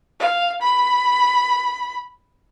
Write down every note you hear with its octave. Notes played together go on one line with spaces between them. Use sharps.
F5
B5